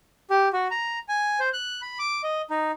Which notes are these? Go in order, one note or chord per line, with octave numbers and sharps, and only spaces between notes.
G4
F#4
A#5
G#5
C5
F#6
B5
D6
D#5
D#4